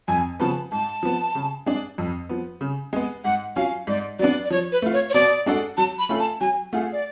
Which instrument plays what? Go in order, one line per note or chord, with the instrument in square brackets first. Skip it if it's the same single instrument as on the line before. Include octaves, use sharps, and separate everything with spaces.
[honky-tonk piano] F2 [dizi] G#5
[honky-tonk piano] C#3 F3 B3 [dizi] A5
[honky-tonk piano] G#2 [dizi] A5
[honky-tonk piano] F3 B3
C#3
G#3 D4
F2
F3 B3
C#3
G#3 B3
[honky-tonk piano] G#2 [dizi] F#5
[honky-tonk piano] F#3 C#4 F4 [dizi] F5
[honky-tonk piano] G#2 [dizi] D5
[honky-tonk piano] F#3 B3 D4 [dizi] D5
[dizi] D5
[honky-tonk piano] F3 [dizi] C#5
[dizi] B4
[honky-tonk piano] A3 F4
[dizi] C#5
C#5
[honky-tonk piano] B2 [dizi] D5
[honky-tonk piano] G#3 D4 F#4 A4
[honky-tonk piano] F#3 [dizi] A5
[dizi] B5
[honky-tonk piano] A3 C#4 F4 A4
[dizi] A5
[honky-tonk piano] F#3 [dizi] G#5
[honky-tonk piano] A3 F4 G#4 [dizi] F#5
[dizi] D5